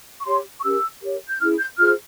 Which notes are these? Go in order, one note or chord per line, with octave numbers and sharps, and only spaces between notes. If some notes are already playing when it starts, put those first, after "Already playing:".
C#6
G4 C#5 C6
C#6
C#4 G4 A#4 E6
G4 A#4 C#5
G6
C#4 E4 G#4 F6
G6
F4 G#4 C5 F6